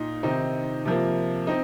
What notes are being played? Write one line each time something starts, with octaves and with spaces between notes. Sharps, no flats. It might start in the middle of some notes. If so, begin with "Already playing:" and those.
Already playing: A#2 D#4
C3 D#3 C4 D#4
C3 F3 A#3
C4 D#4